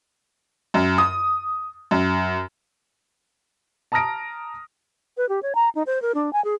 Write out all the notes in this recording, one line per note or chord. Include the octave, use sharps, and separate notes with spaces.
F#2
D#6
F#2
A5 A#5 D#6 F6 A#6 D7
B4
G4
C#5
A#5
D#4
C5
A#4
D4
G#5
G#4